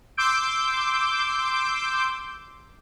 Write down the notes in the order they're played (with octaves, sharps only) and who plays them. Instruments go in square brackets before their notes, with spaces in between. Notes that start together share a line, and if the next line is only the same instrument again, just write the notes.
[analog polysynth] C6 D6 E6 G6 D7